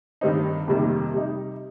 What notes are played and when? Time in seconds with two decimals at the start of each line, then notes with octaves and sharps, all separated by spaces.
0.21 G2 D#3 G3 C4 D#4
0.68 F2 C3 D#3 G3 A#3
1.13 C3 G3 D#4